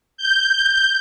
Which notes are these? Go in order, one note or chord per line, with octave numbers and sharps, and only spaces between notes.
G6